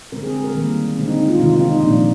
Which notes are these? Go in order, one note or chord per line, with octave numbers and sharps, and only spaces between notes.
D3 G#3 C4 A#4
G#4
A#4
D#3 G3 A#3
D3 G#3 C4
D#4
F4
C3 D#3 G#3 C4 F4
F4
D#4
D#4
A#2 F3 A#3 D4